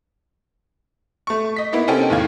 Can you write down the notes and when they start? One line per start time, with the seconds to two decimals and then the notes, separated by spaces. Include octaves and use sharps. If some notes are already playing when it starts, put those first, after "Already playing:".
1.27 A3 C#6
1.56 D#5 B6
1.73 A#3 B3 D#4 E4
1.87 C3 C4 C#4 D#4 A4 G5
2.10 E2 A2 D#3 F5 G#6